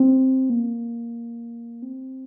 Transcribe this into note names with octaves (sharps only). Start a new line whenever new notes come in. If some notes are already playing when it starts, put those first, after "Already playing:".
Already playing: C4
A#3
C4